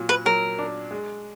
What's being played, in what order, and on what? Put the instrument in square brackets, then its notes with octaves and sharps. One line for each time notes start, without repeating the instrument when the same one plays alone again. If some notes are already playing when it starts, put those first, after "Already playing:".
Already playing: [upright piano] A#2 F#3
[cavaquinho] B4
[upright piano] F#3 [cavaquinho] A#4
[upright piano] D4
G#3